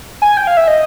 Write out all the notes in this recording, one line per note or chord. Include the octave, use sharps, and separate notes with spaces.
G#5
G5
F5
E5
D#5